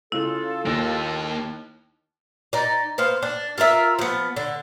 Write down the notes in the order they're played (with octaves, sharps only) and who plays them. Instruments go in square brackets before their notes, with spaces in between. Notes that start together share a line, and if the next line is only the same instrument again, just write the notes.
[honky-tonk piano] C#3 G#3 [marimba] E4 [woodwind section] F4 A4
[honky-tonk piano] D#2 A#6 D7 [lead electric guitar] A#3 D#4
[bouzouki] D#4 D5
B3 C5 F5
D4
F4 A#4 C#5 E5
F3 B3
D3